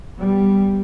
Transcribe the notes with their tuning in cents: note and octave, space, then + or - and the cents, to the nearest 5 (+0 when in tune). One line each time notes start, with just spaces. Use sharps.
G3 +0 B3 +0